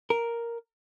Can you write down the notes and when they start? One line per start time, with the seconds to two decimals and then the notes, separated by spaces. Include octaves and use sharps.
0.10 A#4